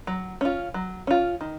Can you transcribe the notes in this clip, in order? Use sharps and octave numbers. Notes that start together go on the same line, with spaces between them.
F#3
C#4 F4
F#3
C#4 F4
D#3